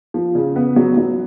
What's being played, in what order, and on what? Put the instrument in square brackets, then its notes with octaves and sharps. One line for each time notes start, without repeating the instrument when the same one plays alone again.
[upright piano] F3
C#3
B3
F#3
F#3